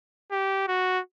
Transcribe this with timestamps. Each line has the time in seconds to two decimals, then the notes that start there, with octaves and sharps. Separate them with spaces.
0.31 G4
0.68 F#4